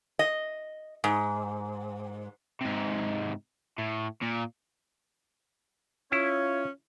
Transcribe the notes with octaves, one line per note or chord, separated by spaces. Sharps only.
D#5
G#2
G#2 C3
A2
A#2
C#4 E4 F4 C#5